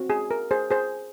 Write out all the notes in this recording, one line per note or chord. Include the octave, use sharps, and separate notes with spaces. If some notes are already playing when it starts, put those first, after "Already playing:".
Already playing: C4 F#4
G#4
A#4
G#4 C5
G#4 C5